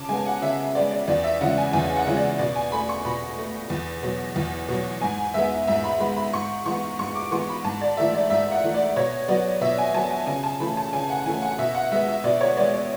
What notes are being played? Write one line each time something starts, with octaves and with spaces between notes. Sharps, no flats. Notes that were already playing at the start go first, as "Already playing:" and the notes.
Already playing: C#3 A5 D6
G#3 B3 G#5
F#5
C#3 E5
G#3 B3 D5
D5
E2 D5
E5
C#3 E3 G#3 F#5
G#5
E2 G#5
F#5
C#3 E3 G#3
D5
B2 D5
G#5
A3 B5
C#6
B2 B5
A3
E2
B2 F#3
E2
B2 F#3
G#2 G#5
G#3 B3 E5
G#2 E5
B5
G#3 B3 B5
B5
G#2 C#6
E3 G#3 B3 C#6
G#2 C#6
D6
E3 G#3 B3 C#6
B5
G#2 A5
D5
E3 A3 E5
D5
G#2 E5
F#5
E3 A3
D5
B2 C#5
F#3 B3 D5
B2 E5
G#5
F#3 B3 A5
G#5
C#3 G#5
A5
E3 A3 B5
A5
C#3 G#5
F#5
E3 A3 G#5
F#5
B2 E5
F#5
G#3 B3 E5
E5
B2 D5
C#5
G#3 B3 D5
D5